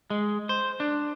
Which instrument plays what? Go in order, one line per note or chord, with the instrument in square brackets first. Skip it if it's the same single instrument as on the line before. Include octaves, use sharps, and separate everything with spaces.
[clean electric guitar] G#3
C5
D4